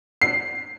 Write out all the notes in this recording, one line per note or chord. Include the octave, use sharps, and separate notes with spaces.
C7